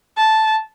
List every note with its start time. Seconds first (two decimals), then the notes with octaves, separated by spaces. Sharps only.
0.17 A5